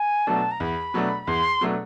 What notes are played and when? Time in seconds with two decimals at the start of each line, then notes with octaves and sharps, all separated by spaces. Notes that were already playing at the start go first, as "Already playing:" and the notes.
Already playing: G#5
0.27 B2 F#3 A3 D4 A5
0.51 A#5
0.60 E2 B5
0.94 B2 F#3 A3 D4
1.27 E2 C6
1.61 B2 F#3 A3 D4